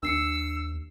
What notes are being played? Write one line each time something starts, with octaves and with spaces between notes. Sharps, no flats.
D#2 D4 E6 C7 C#7